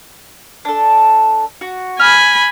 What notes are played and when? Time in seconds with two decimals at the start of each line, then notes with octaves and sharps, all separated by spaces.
0.65 D4 A4
1.61 F#4
2.00 G#5 B5 F6